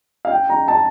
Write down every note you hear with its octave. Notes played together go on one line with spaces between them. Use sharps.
F5
G5
A#5
A5